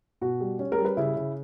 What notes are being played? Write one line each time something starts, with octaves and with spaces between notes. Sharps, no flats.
B2 F#4
G3
C#4
A#4
G3
B4
C#3 E4
C#3